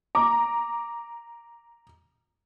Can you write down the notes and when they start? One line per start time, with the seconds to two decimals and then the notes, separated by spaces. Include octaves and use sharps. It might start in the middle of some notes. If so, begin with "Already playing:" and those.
0.15 A#5 D6